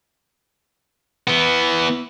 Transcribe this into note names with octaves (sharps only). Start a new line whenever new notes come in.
E3 B3